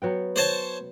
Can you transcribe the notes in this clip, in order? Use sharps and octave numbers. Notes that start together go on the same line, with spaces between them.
F#3 B3 G5
C5 C#5 A5